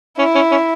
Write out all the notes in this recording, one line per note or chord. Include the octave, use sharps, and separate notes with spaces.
C#4 E4
C#4
C#4